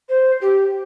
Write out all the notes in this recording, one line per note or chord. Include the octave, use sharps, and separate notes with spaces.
C5
G4